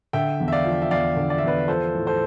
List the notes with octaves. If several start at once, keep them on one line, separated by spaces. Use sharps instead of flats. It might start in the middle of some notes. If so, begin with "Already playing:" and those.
D3 E5 G5
E2
E5
D5 F5
F3
E5
E2 D5 F5
D3
D5
E5
E2 B4 D5
F3 A4 C5
A2
A4 C5